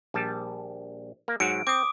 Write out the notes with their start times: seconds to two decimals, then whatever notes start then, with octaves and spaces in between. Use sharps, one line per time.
0.14 A#1 G3 A5
1.28 A#3
1.40 G#2 F#3 F#4 D7
1.67 C4 D6 D#6